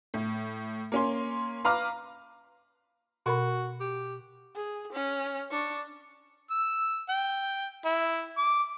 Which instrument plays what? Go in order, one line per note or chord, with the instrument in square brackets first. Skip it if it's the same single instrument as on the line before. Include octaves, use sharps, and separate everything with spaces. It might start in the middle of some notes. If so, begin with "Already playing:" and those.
[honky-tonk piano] A2
A#3 C#4 C6
B4 F5 A#5 D6 F6
[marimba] B2 A#4 B5 [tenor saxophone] F#4
[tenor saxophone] G4
[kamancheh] G#4
C#4
D4 C#6
[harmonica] E6
G5
E4
D6